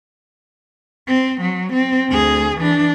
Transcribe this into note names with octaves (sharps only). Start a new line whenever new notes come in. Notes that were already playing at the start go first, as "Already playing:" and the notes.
C4
F#3
C4
D2 G#4
E3 D4